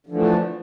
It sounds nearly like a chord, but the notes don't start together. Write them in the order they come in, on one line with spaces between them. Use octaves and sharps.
D3 F3 E3 A3 D4